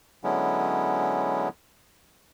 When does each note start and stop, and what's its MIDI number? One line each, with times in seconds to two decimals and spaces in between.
0.24 1.49 50
0.24 1.49 54
0.24 1.49 56
0.24 1.49 59
0.24 1.49 61
0.24 1.49 64